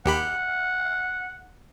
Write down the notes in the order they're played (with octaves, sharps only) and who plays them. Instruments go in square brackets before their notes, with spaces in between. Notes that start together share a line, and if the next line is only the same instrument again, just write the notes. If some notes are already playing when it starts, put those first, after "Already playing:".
[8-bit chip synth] D#2 G4 B5 [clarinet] F#5